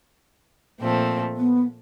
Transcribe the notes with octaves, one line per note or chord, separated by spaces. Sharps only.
A#2 F3 A3 C4
B3